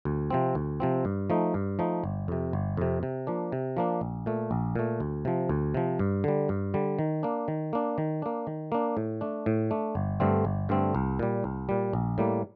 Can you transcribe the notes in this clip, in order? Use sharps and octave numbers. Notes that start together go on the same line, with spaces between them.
D2
C3 F3 C4
D2
C3 F3 C4
G2
F3 A3 D#4
G2
F3 A3 D#4
G1
F2 C3
G1
F2 C3
C3
F3 A#3 D4
C3
F3 A#3 D4
A#1
A#2 A3
A#1
A#2 A3
D2
C3 F3
D2
C3 F3
G2
D3 G3
G2
D3 G3
D#3
A#3 D4
D#3
A#3 D4
D#3
A#3 D4
D#3
A#3 D4
A2
A3 D4
A2
A3 D4
G1
G2 D3 A3 C4
G1
G2 D3 A3 C4
C2
A#2 G3
C2
A#2 G3
A#1
A2 G3 A#3